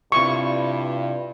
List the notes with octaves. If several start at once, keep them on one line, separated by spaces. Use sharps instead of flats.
G2 C3 E4 F4 C#6